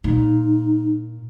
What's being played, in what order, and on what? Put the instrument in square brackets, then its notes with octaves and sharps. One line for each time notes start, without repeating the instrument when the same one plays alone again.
[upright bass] A#2 [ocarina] D#4